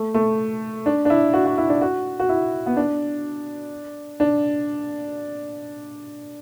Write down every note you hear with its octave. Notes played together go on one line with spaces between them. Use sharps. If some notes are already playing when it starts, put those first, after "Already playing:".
Already playing: A3
A3
D4
D4
E4
F#4
F#4
E4
D4
F#4
F#4
E4
B3
D4
D4